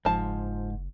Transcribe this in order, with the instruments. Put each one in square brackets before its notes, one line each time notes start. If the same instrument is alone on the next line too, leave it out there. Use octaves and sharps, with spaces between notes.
[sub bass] F#1 [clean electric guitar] G#2 [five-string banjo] F3 A5